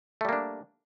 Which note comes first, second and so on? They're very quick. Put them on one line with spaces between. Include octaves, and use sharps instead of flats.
A3 G3 A#3 D4